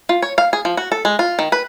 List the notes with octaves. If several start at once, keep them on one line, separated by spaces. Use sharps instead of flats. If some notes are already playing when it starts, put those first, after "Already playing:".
F4
C#5
F5
G#4
F3
F#4
A4
G#3
F4
D#3
B4